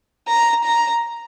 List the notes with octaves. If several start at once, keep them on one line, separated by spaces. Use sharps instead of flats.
A#5
A#5